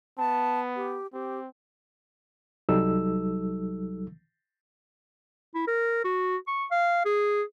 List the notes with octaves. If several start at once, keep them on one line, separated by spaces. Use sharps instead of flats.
B3 A5
G4
C4 G4
C2 F#3 G3 D#4 A4 E6
E4
A#4
F#4
C#6
F5
G#4